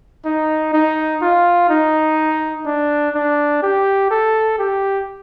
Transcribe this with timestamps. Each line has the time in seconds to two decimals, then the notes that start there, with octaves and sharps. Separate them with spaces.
0.25 D#4
0.73 D#4
1.22 F4
1.69 D#4
2.66 D4
3.15 D4
3.63 G4
4.11 A4
4.59 G4